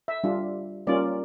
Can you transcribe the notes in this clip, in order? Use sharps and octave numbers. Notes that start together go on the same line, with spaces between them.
E5
G3 D4 F4
G3 A#3 C#4 F4 D5